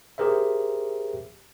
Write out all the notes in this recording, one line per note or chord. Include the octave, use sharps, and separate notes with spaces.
G4 G#4 A#4 C5 E5